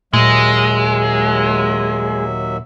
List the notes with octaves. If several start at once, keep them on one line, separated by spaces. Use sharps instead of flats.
D#2 A#2 F#3 G#3 E5